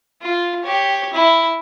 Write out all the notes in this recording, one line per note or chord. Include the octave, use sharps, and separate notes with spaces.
F4
G4 C#5
E4